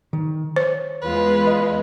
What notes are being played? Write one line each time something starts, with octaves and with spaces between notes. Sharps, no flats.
D#3
C5 C#5
E2 G#3 F4 B4
D#5